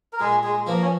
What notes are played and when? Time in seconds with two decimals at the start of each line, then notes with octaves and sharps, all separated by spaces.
0.13 A#4
0.20 A#2 G#3 G#4
0.44 G#3 G#4
0.56 G#3
0.66 F3 A#3 B3 F#4
0.82 C#4